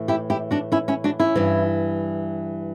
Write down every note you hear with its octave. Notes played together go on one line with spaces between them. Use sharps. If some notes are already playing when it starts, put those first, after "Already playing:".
Already playing: A2 E3
E4 G4
E4 G4
D4 F#4
C#4 E4
C#4 E4
D4 F#4
C#4 E4
G2 E3